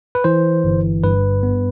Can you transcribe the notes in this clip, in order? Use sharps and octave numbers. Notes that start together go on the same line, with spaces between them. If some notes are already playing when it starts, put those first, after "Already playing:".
B4
E3 C5
G1
G2 B4
B3